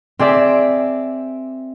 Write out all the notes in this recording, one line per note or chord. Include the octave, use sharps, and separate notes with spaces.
C4 G#4 D5 E5